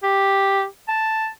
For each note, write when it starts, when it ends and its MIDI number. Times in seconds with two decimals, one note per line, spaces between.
0.03 0.64 67
0.88 1.28 81